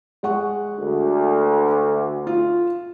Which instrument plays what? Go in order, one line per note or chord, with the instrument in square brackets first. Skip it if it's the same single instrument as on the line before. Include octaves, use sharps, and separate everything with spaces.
[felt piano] G#3 F#5 C#6
[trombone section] D2
[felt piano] F4